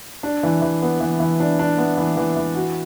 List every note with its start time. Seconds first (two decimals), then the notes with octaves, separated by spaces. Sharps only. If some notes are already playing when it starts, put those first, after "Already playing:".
0.23 D4
0.43 E3
0.62 E3
0.82 B3
1.00 E3
1.20 E3
1.40 D4
1.59 D4
1.78 B3
1.97 E3
2.17 E3
2.36 E3
2.55 F#4